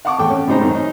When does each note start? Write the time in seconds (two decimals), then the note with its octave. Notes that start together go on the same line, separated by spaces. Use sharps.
0.05 F5 F#5 A5 C#6 D6
0.18 E2 A2 A4 G5
0.30 C#4
0.47 A2 C#3 G#3 D#4 C5 A#5
0.61 F#2 D#3
0.74 D#4